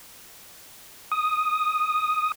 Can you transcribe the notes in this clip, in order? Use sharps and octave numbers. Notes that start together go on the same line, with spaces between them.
D#6